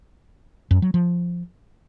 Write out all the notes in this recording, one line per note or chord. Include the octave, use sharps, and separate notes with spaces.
F#2
F#3
F3